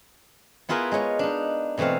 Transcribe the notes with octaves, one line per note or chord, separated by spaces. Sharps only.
B3 E4 F4 G#4 A#4 B4
G#3 G#4 C#5 D#5
D4 D#4
B2 E3 A3 C4 F5